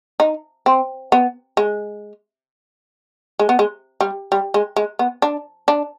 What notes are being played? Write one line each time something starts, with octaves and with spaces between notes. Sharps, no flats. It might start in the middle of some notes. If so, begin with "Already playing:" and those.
D#4
C4
B3
G#3
G#3
B3
G#3
G3
G3
G#3
G#3
B3
D4
D4